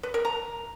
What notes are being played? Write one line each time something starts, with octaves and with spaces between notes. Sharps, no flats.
B4
A#4
A#5